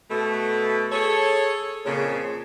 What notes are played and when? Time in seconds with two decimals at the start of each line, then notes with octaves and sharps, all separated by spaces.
0.10 B2 A3
0.92 G#4 A4 C#5
1.85 F2 A#2 C#3